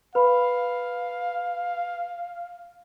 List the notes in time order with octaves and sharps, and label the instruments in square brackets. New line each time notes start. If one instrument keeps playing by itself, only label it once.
[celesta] B4 B5 [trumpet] F5